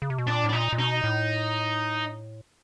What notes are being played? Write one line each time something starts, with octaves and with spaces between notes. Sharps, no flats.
C#3
C3
B2
A#2 D4
A2
D4
A#2 D#4
A#2
B2 D#4
A2